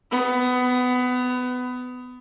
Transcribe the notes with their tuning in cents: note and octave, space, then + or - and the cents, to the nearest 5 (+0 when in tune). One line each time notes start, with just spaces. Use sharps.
B3 +20